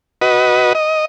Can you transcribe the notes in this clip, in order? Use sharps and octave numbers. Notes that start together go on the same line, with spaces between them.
F#4 B4 D#5
D#5